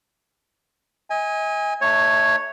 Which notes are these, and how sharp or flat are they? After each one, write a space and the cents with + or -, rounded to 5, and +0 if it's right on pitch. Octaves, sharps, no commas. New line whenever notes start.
D#5 +35 G#5 -15
A3 +0 D#4 -35 C#5 +0